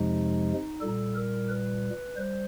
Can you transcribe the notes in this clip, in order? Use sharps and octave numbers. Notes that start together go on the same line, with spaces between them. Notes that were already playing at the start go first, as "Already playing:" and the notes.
Already playing: F2 C3 F3 G#3 D#4
A#2 G3 A4
A#4
B4
G3 C5